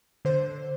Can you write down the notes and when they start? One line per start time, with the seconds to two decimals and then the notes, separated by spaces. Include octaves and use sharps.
0.25 D3 C5